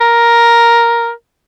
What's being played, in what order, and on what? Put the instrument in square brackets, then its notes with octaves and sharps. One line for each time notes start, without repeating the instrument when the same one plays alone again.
[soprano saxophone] A#4